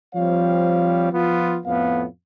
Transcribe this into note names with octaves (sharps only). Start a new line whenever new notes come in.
F3 G3 C4 C#5 F5
F3 B3 F4
F2 A2 B3 F5